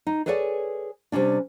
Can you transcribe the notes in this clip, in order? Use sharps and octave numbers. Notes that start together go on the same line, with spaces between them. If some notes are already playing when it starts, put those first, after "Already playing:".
D#4
G#4 A4 B4 C#5 D5 G#5
C3 G3 G#3 C#4 D4